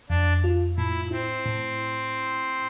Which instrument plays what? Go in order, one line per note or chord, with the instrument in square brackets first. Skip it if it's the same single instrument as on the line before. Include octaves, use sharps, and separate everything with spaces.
[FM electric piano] F2 [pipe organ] D4
[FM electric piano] F4
[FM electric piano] A2 [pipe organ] E4
[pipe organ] C4 [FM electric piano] E4
[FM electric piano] A2